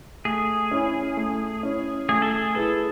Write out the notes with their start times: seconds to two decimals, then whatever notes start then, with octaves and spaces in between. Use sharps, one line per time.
0.25 A3 G#4
0.71 C#4 E4
1.17 A3
1.63 C#4 E4
2.09 A3 G#4
2.22 A4
2.32 G#4
2.55 E4 G#4 A4 B4